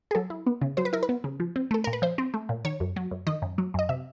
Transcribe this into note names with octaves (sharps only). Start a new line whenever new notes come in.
G#4
F#3 A4
E4
B3
C#3
F#3 C5
B4
E4 A#4
B4
B3
C#3
F3
C4
A3 A4
A#2 A#4
B4
F3 C5
C4
A3
A#2
D#3 C#5
F#2
F#3
F#2
D#3 D#5
F#2
F#3
F#2 D#5
C3 E5